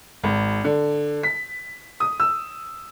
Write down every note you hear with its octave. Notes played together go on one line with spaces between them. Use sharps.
G#1
D3
B6
D#6
E6